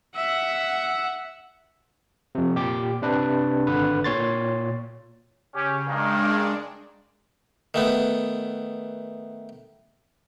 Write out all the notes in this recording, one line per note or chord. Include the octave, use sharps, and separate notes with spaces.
E5 F#5
F2 C3
A#2 G4 D6
C3 D4 B4
G#1 D3 B4
A#2 C#5 C6 A6
C#3 C#4 G4
G2 D#3 G#3 A#3 D4
D#3 A3 B3